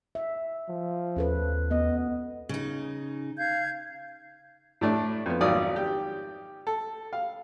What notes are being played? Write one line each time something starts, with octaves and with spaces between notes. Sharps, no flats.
E5
F3
D#2 C#4 A4 B4
B3 D#5
C#3 D#4
F5 G6 G#6
A2 A3 D4
F2 B3
G#1 F#3 F4 C#5 D5 D#6
G4
A4
F5